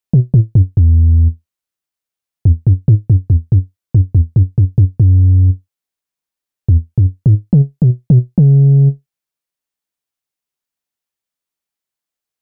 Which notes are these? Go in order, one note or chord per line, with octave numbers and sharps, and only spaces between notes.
B2
A2
F#2
E2
E2
F#2
G#2
F#2
E2
F#2
F#2
E2
F#2
F#2
F#2
F#2
E2
F#2
G#2
C#3
B2
B2
C#3